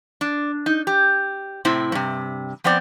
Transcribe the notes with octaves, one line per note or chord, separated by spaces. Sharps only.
D4
D#4
G4
A2 C3 C4 E4
G2 C3
F3 B3 C4 D5